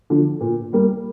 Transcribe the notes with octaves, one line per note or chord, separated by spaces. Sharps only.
D3 F3
A#2
G3 A#3